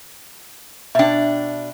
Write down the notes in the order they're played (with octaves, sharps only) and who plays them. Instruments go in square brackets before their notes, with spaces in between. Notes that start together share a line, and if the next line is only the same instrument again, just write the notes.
[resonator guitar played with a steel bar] B2 D4 [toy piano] E5 G5